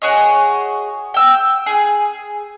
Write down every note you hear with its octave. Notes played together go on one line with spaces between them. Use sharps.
F#4 G#4 C#5 D#5
G5 E6
G#4